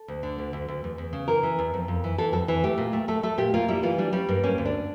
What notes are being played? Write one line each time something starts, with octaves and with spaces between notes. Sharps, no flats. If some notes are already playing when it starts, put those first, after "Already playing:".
Already playing: A4
D2
D3
D2
D2
D2
E2
E2
C#3
E3 A#4
E3
E2
F2
F2
E3
E3 A4
F2 A4
E3
A3 G4
A#2
A3
A3 A4
A3 A4
A#2 G4
A#3 F4
G3 E4
E3 F4
G3 D4
G3 C#4
G2 A#3
A#3 C#4
D2
D4